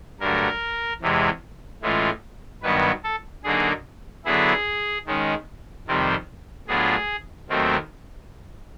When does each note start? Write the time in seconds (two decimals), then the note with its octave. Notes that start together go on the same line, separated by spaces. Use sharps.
0.20 G2 D3 F#3 A3 A#4
1.01 E2 C3 E3 G#3
1.82 A2 E3 G#3 C#4 F4
2.62 G2 D#3 F#3 B3 B4
3.04 A4
3.44 D3 F#3 A#3 D#4 G#4
4.25 D3 F#3 B3 E4 G#4
5.06 D#3 G#3 C#4
5.87 F2 C3 D#3 G3 C4
6.67 A2 F#3 B3 D4 F4 G#4
7.48 D#2 D#3 F#3 A3 C4